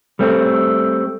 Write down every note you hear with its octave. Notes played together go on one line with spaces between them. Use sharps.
G3 A3 C4